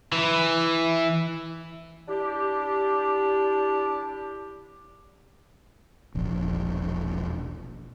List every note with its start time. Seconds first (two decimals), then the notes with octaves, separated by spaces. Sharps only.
0.12 E3
2.09 D4 E4 G4
6.15 E1 A#1